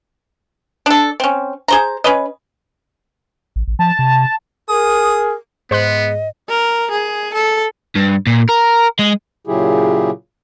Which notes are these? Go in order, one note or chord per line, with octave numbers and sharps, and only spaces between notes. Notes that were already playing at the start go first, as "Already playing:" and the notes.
D4 A4
C4 C#4
G#4 C5 A#5
C#4 B4 D#5
A1
A1
F3 A5
C3
G#4 A#4 D#6
G#2 B3 C5 D#5 C6 F#6
A#4
G#4
A4
G2
A#2
A#4
G#3
A#2 C#3 F#3 E4 G4 G#4